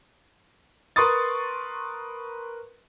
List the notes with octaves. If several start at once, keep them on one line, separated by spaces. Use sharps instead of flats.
A#4 B4 C6 C#6 D#6 A6